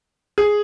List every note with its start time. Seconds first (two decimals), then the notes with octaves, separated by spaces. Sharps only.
0.38 G#4